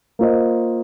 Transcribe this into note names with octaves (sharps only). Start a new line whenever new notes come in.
A#3 F4 C5 D#5